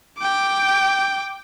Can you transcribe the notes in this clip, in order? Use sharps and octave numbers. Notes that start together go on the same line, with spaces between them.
G5 D6